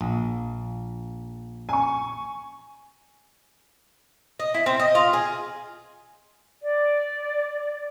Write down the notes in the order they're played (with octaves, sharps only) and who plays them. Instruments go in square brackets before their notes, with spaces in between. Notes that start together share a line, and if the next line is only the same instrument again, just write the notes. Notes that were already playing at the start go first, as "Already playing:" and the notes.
[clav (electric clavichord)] A#1
[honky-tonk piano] G#5 C#6
[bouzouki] D#5
E4
C4
D#5
F4
G#4
[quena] D5